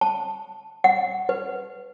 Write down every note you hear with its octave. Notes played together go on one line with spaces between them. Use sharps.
A5
F#5
B4